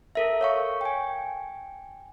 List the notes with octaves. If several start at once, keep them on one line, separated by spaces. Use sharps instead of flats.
A4 A#4 E5
C#5 F5 C#6
G5 G#5